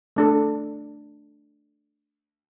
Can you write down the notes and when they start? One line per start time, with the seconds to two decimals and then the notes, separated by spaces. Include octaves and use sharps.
0.16 A3 D4 A4